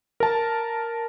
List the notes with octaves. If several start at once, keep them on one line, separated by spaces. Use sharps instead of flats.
A#4 A5